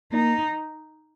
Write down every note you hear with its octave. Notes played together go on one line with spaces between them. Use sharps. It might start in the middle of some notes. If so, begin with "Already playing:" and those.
A#3 D#4